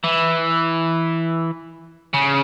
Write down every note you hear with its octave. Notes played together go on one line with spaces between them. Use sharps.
E3
C#3